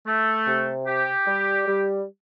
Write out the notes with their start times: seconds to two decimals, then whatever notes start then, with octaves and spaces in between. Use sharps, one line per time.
0.07 A3
0.46 C3
0.87 G4
1.26 G3
1.66 G3